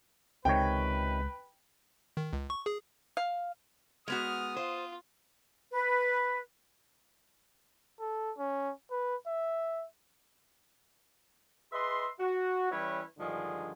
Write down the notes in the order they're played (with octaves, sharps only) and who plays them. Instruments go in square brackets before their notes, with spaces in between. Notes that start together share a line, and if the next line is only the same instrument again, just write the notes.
[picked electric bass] C#2 G#3 [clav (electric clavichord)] C3 D#3 C#5 [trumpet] B4 [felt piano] G5
[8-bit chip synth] D#3
C#2
C#6
G#4
[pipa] F5
[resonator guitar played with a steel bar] G#3 B3 F#4 [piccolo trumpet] D#6 [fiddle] F6
[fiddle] F4 [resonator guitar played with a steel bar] C5
[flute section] B4
[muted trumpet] A4
C#4
B4
E5
[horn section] G#4 B4 D#5 E5 C6
F#4
E3 G3 C#4 E4 B4 C#5
G2 D3 D#3 F3 G#3 G#4